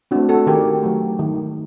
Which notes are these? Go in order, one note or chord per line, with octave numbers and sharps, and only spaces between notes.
A3 C4 D4 F#4
F#4 A4
D#3 G4 A#4
F#3 A3
D#3